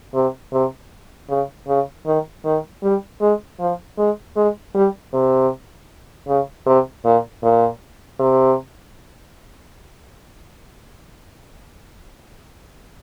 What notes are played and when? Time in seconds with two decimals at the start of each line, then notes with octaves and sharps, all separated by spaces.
0.14 C3
0.53 C3
1.29 C#3
1.68 C#3
2.06 D#3
2.45 D#3
2.83 G3
3.21 G#3
3.60 F3
3.98 G#3
4.36 G#3
4.75 G3
5.13 C3
6.28 C#3
6.66 C3
7.05 A#2
7.43 A#2
8.20 C3